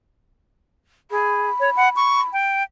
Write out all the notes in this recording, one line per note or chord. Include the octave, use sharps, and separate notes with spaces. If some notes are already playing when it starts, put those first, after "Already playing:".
G#4 B5
C#5
F#5
C#6
G5